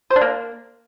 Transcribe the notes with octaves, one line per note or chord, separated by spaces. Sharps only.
C5
D4
A#3